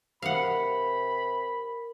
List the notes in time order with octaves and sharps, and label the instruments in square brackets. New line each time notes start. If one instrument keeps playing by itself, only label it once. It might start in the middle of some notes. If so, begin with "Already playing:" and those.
[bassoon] C3 [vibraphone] A#4 [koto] F5 F#5 [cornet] B5